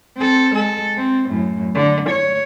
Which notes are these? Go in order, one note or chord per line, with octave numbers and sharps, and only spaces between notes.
C4 A4
G#3 A4
C4
F#2 A2
D3
C#5